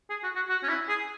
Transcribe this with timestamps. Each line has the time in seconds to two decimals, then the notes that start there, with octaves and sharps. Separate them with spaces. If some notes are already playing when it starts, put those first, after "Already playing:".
0.09 G#4
0.23 F#4
0.35 F#4
0.49 F#4
0.63 C#4
0.68 E4
0.88 G#4